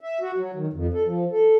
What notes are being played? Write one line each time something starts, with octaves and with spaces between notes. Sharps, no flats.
E5
F#4
F#3
D#3
F2
A4
F3
A4